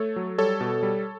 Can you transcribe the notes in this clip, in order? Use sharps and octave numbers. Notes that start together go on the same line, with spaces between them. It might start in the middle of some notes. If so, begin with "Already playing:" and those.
Already playing: A3 A4 C#5
F#3
G3 A4 C#5
B2
G3